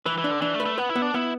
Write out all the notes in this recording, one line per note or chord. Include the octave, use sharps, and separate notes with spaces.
E3 B4
E3
D4
D3
E3 D4
A3
B4
A3
B3 B4
E4
B3
D4
B3 E4